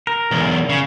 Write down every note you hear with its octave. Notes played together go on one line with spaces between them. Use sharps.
A#4
B1 E2
C#3